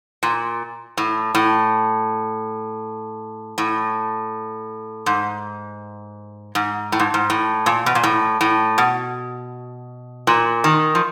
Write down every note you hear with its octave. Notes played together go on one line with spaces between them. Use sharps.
A#2
A2
A2
A2
G#2
G#2
A2
G#2
G#2
A2
A#2
B2
A#2
A2
A2
B2
A#2
D#3
F3